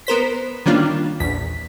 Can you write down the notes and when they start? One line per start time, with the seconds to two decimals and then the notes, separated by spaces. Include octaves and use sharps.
0.07 B3 A#4 C5 B6
0.66 D#3 G3 A#3 C#4 D4 F4
1.20 A#1 E2 B6